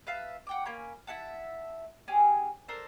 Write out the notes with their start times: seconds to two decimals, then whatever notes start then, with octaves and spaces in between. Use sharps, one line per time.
0.07 B4 E5 F5 A5
0.47 F#5 G5 D6
0.66 A#3 C#4 B5
1.07 E4 E5 F#5 A5
2.08 C#4 G4 G#4
2.68 D4 A4 A#4 C5